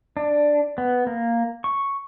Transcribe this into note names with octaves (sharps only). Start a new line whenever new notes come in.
D4
B3
A#3
C#6